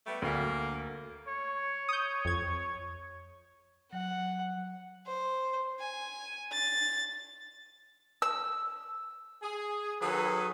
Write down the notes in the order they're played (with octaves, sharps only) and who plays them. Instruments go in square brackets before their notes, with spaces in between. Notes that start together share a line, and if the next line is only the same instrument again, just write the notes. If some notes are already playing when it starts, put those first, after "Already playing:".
[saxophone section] G3 A3 B3
[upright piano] D2 [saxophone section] A#3
[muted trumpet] C#5
[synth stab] D#6 G6
F2 G#6
[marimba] F#3 [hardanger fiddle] F#5
[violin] C5
G#5
A6
[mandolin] E6
[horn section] G#4
D#3 F#3 G#4 A4 B4